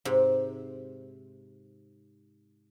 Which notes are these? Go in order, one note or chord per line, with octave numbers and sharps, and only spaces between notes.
G#2 C3